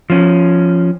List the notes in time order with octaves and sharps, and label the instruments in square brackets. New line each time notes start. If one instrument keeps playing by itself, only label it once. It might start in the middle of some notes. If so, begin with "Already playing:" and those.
[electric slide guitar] F3 C#4